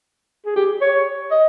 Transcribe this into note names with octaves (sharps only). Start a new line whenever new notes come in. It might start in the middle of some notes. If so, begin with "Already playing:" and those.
G#4
G4
C#5
D#5